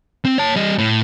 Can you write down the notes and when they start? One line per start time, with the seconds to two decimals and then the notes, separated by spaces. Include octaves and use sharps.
0.25 C4
0.38 C#5 A5
0.56 G3 D#5
0.78 A2